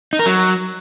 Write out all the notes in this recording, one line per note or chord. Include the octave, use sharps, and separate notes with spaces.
D#4
A#4
F#3